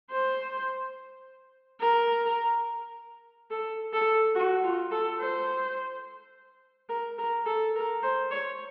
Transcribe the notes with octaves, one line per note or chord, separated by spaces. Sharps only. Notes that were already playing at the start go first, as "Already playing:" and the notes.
C5
A#4
A4
A4
F#4
F4
A4
C5
A#4
A#4
A4
A#4
C5
C#5